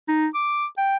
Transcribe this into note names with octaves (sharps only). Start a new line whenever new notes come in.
D#4
D6
G5